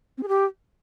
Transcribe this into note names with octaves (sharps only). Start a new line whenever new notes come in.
C4
G#4
G4